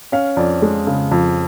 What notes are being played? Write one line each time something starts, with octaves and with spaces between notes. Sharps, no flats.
C#4 F5
F2 D5
G#3
C#3
F2